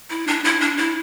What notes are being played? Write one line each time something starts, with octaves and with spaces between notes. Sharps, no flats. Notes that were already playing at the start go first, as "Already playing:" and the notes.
E4
D4
E4
D4
E4